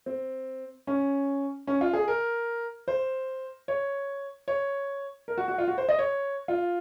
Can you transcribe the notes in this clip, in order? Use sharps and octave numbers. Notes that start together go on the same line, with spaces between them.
C4
C#4
C#4
F4
G#4
A#4
C5
C#5
C#5
A#4
F#4
F#4
F4
F#4
C5
D#5
C#5
F4